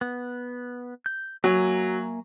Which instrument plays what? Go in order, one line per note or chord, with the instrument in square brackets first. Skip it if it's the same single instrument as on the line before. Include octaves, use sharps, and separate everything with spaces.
[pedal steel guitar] B3
G6
[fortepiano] F#3 [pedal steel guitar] A#3 E5 G#5